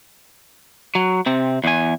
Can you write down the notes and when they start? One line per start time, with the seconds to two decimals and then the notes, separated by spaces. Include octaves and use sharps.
0.95 F#3
1.26 C3 C4
1.64 E2 G#5